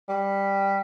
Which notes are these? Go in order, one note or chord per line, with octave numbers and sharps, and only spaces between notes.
G3